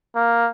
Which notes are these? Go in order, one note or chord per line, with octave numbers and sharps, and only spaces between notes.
A#3